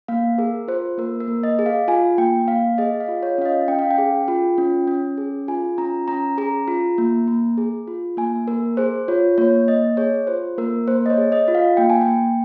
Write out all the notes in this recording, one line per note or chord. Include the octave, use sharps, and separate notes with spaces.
A#3 F5
G#4 A#4
F4 C5
A#3 A#4
A#4
A#3
D#5
G#4
F5
F4 G#5
A#3 G5
A#3 F5
G#4 D#5
F5
F4
C#5
C#4 F5
D#5
C#4 G5
F5
G5
G#4
F4
C#4
C#4
G#4
F4 G#5
C#4 A#5
C#4 A#5
G#4 A#5
F4
A#3
A#3
G#4
F4
A#3 G#5
A#3 A#4
G#4 C5
F4 C#5
A#3 C#5
A#3 D#5
G#4 C#5
F4 C5
A#3 A#4
A#3 C5
D#5
C#5
G#4
D#5
F4
F5
A#3 G5
G#5
G5
A#3